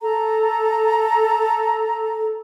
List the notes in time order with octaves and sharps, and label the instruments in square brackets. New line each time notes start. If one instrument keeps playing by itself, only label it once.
[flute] A4 [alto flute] A#5